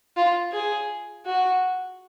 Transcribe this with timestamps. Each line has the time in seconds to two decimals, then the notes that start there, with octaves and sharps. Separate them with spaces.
0.16 F4
0.52 G#4
1.25 F#4